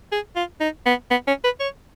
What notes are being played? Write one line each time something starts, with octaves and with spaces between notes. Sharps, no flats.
G#4
F4
D#4
B3
B3
C#4
B4
C#5